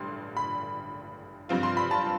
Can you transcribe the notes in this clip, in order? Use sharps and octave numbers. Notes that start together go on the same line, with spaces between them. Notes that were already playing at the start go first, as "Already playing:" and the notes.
Already playing: A1 G2 D3 C6
B5
G2 F3 C4 F4
C6
B5
A5